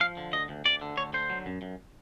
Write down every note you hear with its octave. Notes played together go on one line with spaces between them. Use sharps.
F3 F5
D3
D2 D#5
D2
D2 D5
D3
D2 C#5
D3 C5
F#3
F#2
F#2